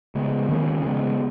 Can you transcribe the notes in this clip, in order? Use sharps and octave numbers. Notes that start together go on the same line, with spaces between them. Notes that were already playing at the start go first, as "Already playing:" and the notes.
C#3 G#3 B3
D#3 A#3 C#4
C#3 G#3 B3